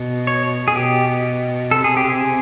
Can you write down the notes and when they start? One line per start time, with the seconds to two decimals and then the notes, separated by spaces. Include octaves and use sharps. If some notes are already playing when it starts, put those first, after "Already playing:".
Already playing: B2
0.27 C#5
0.68 G#4
0.75 B2 G4
1.71 C3 A4
1.84 G#4
1.97 G4
2.10 G#4